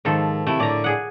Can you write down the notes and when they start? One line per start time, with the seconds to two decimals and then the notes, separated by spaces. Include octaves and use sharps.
0.05 G#2 D#3 F3 A4
0.47 C3 A3 E4
0.60 A2 D3 D5 A#5
0.84 G#4 F#5